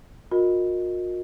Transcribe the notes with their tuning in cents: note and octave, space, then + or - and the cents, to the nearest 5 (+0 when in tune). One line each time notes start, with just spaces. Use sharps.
F#4 -45 A#4 +0 D#5 +0